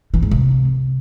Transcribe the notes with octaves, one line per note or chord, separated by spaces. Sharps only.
E3
G#2
C3